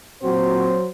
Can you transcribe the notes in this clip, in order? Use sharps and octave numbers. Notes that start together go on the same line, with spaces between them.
A#2 F#3 C4 F#4 C5